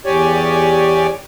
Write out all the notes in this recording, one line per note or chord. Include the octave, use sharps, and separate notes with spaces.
E2 G4 C#5 D5 G#5